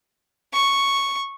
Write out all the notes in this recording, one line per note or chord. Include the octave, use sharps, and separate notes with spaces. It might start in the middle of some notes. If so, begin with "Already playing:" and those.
C#6